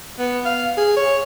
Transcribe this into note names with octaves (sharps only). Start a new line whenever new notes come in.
B3
F5
G#4
C#5